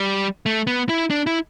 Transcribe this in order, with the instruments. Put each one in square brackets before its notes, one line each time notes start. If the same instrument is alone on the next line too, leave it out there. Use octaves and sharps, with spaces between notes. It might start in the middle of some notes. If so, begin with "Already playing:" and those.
Already playing: [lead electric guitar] G3
A3
B3
E4
D4
E4